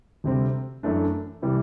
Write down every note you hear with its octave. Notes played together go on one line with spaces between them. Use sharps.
D2 C3 G3 C4
F#2 E3 A3 D4
C3 E3 G3